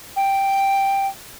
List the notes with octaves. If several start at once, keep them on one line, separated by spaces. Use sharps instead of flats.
G5